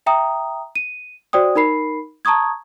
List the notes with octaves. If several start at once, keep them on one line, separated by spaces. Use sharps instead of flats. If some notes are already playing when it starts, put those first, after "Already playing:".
E5 G5 A#5 D#6
D#7
F#4 C5 D5 G5 D#6
D#4 A#4 B5 C7
A5 A#5 C#6 D#6 G#6